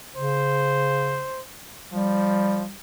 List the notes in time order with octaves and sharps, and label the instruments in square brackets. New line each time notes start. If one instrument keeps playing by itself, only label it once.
[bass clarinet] C#3 [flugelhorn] C5
[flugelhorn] F3 [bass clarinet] G3